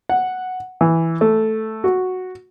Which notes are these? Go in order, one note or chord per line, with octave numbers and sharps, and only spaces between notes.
F#5
E3
A3
F#4